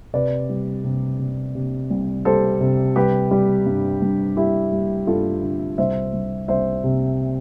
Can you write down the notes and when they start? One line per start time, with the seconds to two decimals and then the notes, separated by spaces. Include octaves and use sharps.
0.14 C3 B4 D5
0.49 G3
0.84 C3
1.19 C3
1.55 C3
1.90 C2
2.25 G3 A4 C5
2.61 C3
2.96 G3 G4 B4
3.31 G3
3.66 G2
4.02 G2
4.37 G3 E4 G4
4.72 G3
5.07 G2 F4 A4
5.43 D3
5.78 C2 C5 E5
6.13 C2
6.48 C2 C5 E5
6.84 C3